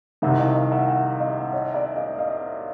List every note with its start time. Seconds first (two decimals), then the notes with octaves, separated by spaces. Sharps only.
0.22 C2 C3 D#3 E5 F#5
0.39 D#5 F5
0.55 D#5 F5
0.72 E5 F#5
0.88 E5 F#5
1.20 D#5 F5
1.53 C#5 D#5
1.74 D5 E5
1.96 D#5 F5
2.18 D#5 F5